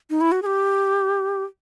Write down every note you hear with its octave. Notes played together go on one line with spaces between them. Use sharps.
D#4
E4
F#4
G#4
G4